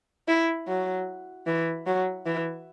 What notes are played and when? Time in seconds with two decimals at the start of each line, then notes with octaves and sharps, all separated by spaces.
0.28 E4
0.68 F#3
1.47 E3
1.87 F#3
2.26 E3